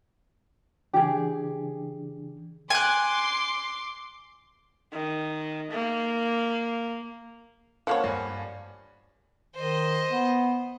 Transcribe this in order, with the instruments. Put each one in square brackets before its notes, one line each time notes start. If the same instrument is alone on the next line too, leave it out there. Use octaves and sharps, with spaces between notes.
[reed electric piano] C#3 E3 D4 [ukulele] G4 G#4
[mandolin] G#5 F#6 [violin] C6 D6
[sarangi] D#3
A#3
[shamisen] F3 A#3 C#5 [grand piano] F5 F#5 A5
[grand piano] G2 G#5
[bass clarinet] D#3 [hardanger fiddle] C5 D#5
[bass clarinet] B3